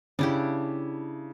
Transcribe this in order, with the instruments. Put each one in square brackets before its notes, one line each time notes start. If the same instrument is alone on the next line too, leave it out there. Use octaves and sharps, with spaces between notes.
[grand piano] C#3 [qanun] D4 E4 G4